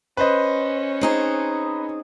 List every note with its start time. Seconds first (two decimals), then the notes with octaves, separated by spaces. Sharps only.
0.17 C#4 B4 C5 D#5
1.01 C4 D#4 G#4